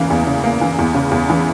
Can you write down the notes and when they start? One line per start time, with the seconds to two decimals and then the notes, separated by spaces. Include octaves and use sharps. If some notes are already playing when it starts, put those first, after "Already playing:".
Already playing: E2 C#3 E3 A#3
0.10 E2
0.27 C#3
0.44 A#3
0.61 E3
0.79 E2
0.94 C#3
1.11 E2
1.30 E3